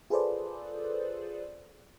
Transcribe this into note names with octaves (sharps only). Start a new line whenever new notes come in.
F4 G#4 A4 B4 C5 D5